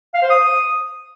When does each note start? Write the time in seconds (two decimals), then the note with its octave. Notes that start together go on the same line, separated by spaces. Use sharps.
0.14 F5
0.22 C5
0.30 D#6